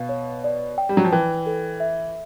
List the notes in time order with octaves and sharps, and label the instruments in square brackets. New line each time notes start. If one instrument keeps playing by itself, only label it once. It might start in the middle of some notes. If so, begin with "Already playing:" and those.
Already playing: [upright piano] B2 [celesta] F5
[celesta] C#5
D5
G5
[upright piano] G3
F#3
F3
[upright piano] E3 [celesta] G5
[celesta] A4
E5